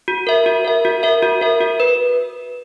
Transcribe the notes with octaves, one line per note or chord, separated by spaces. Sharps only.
F#4
A#4 E5
F#4
A#4 E5
F#4
A#4 E5
F#4
A#4 E5
F#4
B4